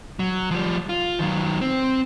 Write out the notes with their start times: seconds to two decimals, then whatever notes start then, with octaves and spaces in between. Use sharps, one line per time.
0.19 F#3
0.51 F3 G3
0.89 F4
1.19 D#3 F#3
1.61 C4